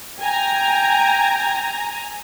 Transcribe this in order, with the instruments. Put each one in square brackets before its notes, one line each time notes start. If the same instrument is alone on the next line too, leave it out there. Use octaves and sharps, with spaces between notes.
[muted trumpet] G5 [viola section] G#5 A#5